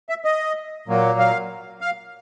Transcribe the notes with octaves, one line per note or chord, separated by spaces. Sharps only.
E5
D#5
A#2 F#3 A#3
F5
F5